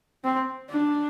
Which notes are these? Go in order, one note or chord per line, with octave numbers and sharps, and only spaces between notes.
C4
D4